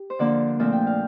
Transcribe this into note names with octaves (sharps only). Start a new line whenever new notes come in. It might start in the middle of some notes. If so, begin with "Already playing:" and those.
Already playing: G4
C5
D3 F3 A#3 D4 D5
A#2 F3 A3 C4
G5
F5